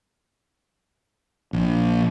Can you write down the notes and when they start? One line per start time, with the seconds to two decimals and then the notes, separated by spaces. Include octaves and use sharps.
1.53 A#1